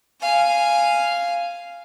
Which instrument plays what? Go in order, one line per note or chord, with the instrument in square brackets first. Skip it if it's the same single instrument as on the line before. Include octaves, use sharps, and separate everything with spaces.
[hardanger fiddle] F5 G#5